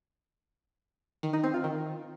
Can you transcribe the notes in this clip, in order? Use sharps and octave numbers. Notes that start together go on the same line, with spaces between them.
D#3
D#4
C4
F4
D#3